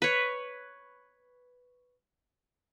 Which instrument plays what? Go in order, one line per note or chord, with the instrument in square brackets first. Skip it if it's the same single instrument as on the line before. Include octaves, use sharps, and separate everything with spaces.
[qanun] B4 C#5